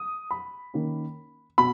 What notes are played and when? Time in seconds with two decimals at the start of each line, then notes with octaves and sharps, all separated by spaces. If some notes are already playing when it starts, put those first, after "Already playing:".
Already playing: D#6
0.31 B5
0.74 D#3 A#3 C#4
1.58 B2 B5